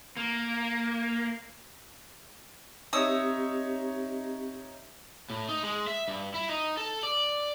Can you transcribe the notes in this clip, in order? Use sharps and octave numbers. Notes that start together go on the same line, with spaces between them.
A#3
C4 D#4 G4 C#5 E5 D#6 E6
A2
D#4
G#3
E5
G2
E4
D#4
A4
D5